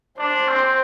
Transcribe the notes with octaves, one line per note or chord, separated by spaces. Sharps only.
D4 C5
C4